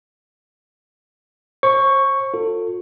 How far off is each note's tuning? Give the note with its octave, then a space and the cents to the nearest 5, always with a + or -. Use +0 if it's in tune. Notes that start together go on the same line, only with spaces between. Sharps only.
C5 +35 C#6 +0
F4 +40 A4 +30